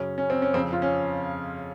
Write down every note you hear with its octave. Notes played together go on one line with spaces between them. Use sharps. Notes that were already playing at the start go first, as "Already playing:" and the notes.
Already playing: F#2 C#3 C#4
C#4
C4
C#4
F2 C#3 C4
F4
C#4